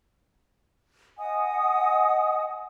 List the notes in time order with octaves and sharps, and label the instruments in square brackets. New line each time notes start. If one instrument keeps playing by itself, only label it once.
[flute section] D#5 F#5 G#5 D#6